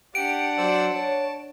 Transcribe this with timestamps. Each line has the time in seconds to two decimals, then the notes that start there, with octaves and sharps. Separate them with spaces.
0.15 D4 G4 F#5 D7
0.58 F#3 C5 D5 E6
0.94 C#5 A5